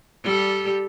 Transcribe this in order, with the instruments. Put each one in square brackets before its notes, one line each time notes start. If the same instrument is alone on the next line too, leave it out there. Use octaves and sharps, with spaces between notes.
[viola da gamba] G3 G4 A4